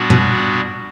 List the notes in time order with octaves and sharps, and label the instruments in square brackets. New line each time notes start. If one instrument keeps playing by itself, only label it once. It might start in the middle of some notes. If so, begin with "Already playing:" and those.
Already playing: [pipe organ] A#2 G3 B3 D4 F#4
[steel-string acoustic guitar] B2